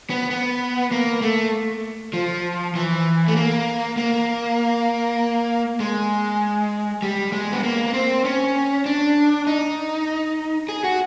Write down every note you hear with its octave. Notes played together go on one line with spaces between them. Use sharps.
B3
B3
A#3
A3
F3
E3
A3
A#3
A#3
G#3
G3
G#3
B3
A#3
C4
C#4
D4
D#4
G#4
F#4